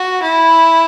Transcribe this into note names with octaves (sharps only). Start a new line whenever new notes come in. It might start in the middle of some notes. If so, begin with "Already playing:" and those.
Already playing: F#4
E4